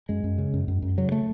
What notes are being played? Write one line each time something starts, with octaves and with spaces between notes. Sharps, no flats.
F#2 G#3
F#2
C#3
F#2
F#2
F#2
C#3 F#3
A3